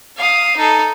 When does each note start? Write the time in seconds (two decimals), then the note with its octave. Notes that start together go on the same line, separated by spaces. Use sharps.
0.17 F5 D#6
0.57 D#4 A4